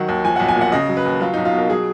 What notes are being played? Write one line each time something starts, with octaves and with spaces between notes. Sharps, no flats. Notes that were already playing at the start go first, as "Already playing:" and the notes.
Already playing: D#3 F#3 F#5
D#2
F3 G#5
F#5
B1
G#5
A#2
F#5
C#3 D#5
F#3
B4
D#2
F#3 F4
D#4
B1
F4
B2 A#4
F#3 G#4